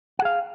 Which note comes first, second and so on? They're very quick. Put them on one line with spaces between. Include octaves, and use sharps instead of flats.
F#5 G#4 F5